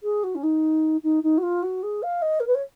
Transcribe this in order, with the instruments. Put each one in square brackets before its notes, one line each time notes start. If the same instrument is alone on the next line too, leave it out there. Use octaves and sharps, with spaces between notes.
[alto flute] G#4
F#4
C#4
D#4
D#4
D#4
F#4
F4
F#4
G#4
F5
D#5
A#4
B4
C#5